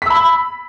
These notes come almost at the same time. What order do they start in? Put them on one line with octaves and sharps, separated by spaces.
B6 E6 B5